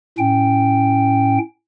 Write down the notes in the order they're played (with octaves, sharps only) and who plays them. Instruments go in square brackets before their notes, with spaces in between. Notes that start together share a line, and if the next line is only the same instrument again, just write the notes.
[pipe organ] A2 C#4 G5